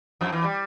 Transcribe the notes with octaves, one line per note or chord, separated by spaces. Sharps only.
F2 F3
E2 E3
G3